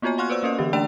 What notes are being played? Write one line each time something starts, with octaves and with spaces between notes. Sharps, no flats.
A#3 B3 F4 F#4 C#5 G#5
F5 F#5 C6 C#6 F6 F#6
B4 C5 D5 E6
A#3 C#4 A#4 D#5
D3 E3 C#4 G4
A3 D4 D5 G5 A#5 F7